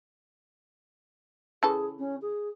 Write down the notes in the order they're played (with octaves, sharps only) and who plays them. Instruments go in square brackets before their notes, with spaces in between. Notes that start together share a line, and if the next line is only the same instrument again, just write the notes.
[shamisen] C#3 E3 A4 [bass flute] G#4
[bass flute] C#4
G#4